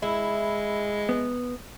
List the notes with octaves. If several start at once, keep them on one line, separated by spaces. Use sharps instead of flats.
G#3 E4
B3